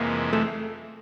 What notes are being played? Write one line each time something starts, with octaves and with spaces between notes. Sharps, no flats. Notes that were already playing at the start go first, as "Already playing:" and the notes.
Already playing: F2 C3 E3 G#3 A#3
A3